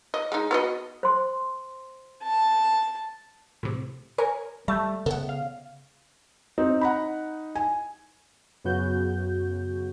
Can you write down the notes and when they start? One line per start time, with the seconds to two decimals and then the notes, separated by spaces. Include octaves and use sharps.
0.14 D#5
0.32 G#3 D#4
0.51 B3 F#4 D#5
1.03 C5 C6
2.23 A5
3.63 A2 C3
4.18 A#4 C#5 G#5
4.68 G3 A3 A5
5.06 C#3 B3 A4 F#5
5.29 F5
6.58 C4 D#4
6.81 F#5 A#5 B5
7.56 G#5
8.65 F#2 C#3 B3 F#4 G6